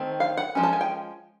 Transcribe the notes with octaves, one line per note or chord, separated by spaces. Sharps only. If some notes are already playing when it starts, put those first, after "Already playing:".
Already playing: D#3 A3 C4
F5
F#5
F3 G#3 C#4
A5
G#5
G5